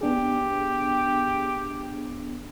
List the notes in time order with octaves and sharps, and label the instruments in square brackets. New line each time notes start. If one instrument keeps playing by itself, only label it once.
[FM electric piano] B3 D4 G#4 [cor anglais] G4